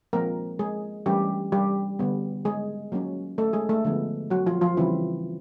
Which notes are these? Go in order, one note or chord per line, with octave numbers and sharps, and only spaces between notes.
F3 G#3 A#3 C4 A#4
G#3 G#4
E3 G3 A3 C#4 G4
G3 G4
D3 G3 B3
G#3 G#4
F#3 A#3 C#4
A3 A4
G#3 G#4
A3 A4
D3 F3 G#3 B3
F#3 F#4
F3 F4
F3 F4
C#3 E3 G3 C4 E4